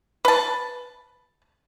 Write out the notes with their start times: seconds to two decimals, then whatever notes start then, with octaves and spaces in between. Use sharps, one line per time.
0.25 B4 A5